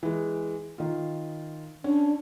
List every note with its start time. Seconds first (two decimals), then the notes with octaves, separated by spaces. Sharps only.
0.03 E3 G#3
0.78 D#3 F4
1.84 C#4 D4